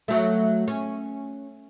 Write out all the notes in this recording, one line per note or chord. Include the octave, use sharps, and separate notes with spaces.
F#3 A3
C#4